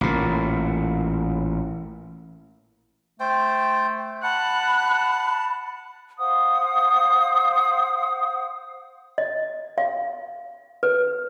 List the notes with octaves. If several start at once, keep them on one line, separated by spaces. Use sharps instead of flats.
A1 A#2
A3 C5 G5
F#5 A5 B5 F#6
C5 F5 F#5 D#6
D#5
F5
B4